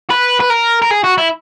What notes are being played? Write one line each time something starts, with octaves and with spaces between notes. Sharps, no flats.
B4
B4
A#4
A#4
G#4
F#4
E4